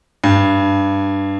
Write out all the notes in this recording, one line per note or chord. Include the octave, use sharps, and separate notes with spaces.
G2